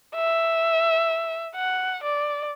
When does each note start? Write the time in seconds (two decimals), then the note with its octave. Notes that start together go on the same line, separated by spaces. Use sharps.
0.15 E5
1.56 F#5
2.03 D5